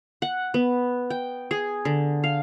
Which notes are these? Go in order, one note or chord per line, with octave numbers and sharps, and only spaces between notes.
F#5
B3
G5
G#4
D3
F5